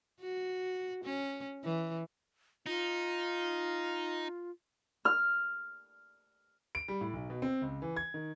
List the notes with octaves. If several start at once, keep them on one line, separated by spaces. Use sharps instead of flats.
F#4
C#4
E3
D#4 F4
F6
D7
G3
A2
B1
B2
C4
C#2
E3
G#6
D#3